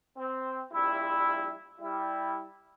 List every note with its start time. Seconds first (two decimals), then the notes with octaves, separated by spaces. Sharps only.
0.18 C4
0.73 A#1 G3 E4
1.79 G3 E4